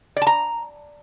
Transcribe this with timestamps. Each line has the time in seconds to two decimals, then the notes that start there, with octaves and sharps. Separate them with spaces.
0.16 D5
0.22 A5
0.27 A#5